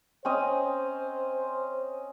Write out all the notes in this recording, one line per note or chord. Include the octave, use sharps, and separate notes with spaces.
C4 C#4 C5 D#5